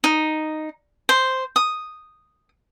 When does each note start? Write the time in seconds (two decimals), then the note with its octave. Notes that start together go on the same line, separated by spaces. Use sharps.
0.04 D#4
1.09 C5
1.56 D#6